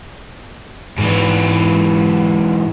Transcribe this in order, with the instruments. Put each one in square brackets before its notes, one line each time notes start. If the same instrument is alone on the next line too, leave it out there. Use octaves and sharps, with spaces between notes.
[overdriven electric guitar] G#2 E3